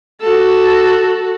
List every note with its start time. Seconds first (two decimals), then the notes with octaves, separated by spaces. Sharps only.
0.21 F#4 A4